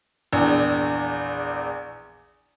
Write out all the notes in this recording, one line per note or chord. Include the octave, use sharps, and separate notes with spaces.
A#1 E2